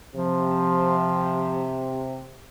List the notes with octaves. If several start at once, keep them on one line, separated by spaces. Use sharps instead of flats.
C3 F3